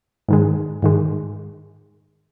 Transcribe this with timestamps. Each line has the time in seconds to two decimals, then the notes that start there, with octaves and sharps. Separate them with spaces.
0.28 G#2 D#3 G#3
0.82 G#2 D#3 G#3